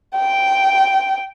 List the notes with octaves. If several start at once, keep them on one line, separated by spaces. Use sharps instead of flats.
G5